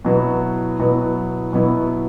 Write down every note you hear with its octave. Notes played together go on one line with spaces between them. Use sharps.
B2 F#3 B3 E4
B2 F#3 B3 E4
B2 F#3 B3 E4